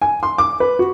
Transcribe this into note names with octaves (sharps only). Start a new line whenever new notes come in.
G#5
C6
D6
B4
F#4